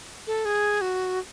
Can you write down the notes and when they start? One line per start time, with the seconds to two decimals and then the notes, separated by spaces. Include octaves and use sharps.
0.27 A4
0.45 G#4
0.81 F#4